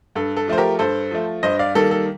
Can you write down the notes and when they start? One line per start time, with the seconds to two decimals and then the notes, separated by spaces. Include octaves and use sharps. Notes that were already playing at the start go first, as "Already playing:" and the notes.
0.15 G2 A4
0.37 A4
0.48 F3 A3 C5
0.58 G4 A#4
0.79 G2 A4 C5
1.11 F3 A3
1.43 G2 C5 D#5
1.59 D5 F5
1.75 D#3 G3 A#3 A4
1.91 A4